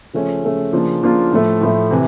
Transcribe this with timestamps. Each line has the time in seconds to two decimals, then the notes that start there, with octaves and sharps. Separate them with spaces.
0.13 C#3 F3 A3 C#4
0.43 C#3 F3 A3 C#4
0.73 C#3 F3 A#3 D4 F4
1.03 C#3 F3 A#3 D4 F4
1.32 A2 F3 A3
1.61 A2 F3 A3
1.91 C3 E3